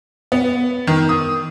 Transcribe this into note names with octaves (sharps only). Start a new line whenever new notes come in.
B3
D#3
D#6